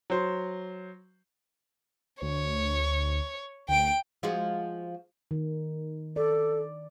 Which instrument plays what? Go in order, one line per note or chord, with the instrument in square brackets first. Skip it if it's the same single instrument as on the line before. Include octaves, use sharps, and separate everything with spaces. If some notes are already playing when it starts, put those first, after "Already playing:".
[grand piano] F#3 C5
[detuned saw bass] D2 [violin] C#5
[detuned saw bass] D2 [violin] G5 D7
[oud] F3 G#3 F#4
[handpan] D#3
[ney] A4 [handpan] D5